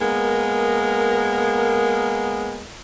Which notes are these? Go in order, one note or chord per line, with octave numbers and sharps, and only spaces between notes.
G#3 A#3 B3 A#4